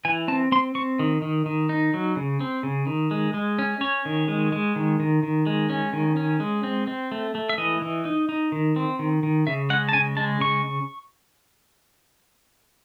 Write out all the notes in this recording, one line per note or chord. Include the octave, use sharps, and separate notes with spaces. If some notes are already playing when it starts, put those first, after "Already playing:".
E3 G#5
C4 A5
C4 C6
C4 C#6
D#3
D#3
D#3
D#4
F#3
C#3
C4
C#3
D#3
G#3
G#3
C#4
C#4 C#5
D#3
G#3
G#3
D#3
D#3
D#3
G#3
C#4
D#3
C#4
G#3
C4
C4
A3
A3
E5
E3 D#5
E3
D#4
D#4
D#3
C4
D#3
D#3
C#3 E5
G#3 F#5
A5
C#3 G#5
G#3 A5
C#3 C#6